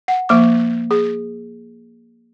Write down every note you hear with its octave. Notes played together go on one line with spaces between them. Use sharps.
F#5
F3 A#3 D6
G#4